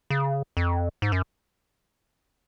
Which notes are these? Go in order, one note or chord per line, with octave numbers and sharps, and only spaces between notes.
C#3
F2
G#2
F#2